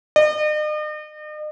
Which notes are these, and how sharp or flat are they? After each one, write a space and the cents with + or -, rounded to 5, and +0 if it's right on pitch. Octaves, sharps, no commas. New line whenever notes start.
D#5 -45